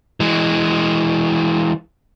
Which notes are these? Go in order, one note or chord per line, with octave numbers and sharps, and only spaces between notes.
E3 G#3